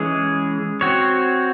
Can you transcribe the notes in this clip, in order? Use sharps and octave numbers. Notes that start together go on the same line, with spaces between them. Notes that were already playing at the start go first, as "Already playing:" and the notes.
Already playing: E3 G#3 C#4 G#4
C4 F#4 C#5